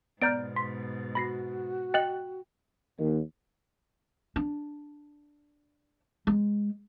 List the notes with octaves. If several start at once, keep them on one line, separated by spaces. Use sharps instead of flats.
G#2 B2 B3 D5 A#5 F6 G6 D7
C6 B6
F#4 B5 A#6 C7
D#5 G5 F#6 A6 C#7 F#7
D#2
D4
G#3